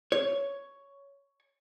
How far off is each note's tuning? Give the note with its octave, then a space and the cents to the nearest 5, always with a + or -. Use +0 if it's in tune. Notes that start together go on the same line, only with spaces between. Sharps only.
C#5 +10